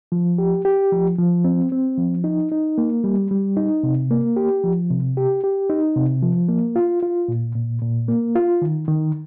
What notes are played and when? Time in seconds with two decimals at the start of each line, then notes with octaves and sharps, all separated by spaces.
0.12 F3
0.38 G4
0.65 G4
0.92 F3
1.18 F3
1.44 C4
1.72 C4
1.97 F3
2.24 D#4
2.52 D#4
2.78 A#3
3.04 G3
3.31 G3
3.57 D#4
3.83 C3
4.11 A#3
4.36 G4
4.64 F3
4.90 C3
5.17 G4
5.44 G4
5.70 D#4
5.96 C3
6.22 F3
6.49 A#3
6.76 F4
7.03 F4
7.28 A#2
7.55 A#2
7.82 A#2
8.08 A#3
8.36 F4
8.62 D#3
8.88 D#3